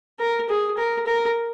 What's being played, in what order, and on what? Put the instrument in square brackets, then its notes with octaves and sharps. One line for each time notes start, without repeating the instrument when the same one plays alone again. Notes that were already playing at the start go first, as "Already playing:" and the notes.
[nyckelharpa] A#4
G#4
A#4
A#4